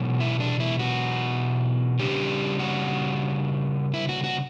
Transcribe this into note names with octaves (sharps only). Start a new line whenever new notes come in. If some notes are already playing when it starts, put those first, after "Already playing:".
Already playing: E2 B2 F#3
E4
D4
E4
F#4
C#3 G3 D4 G4
F#4
E4
F#4
F#4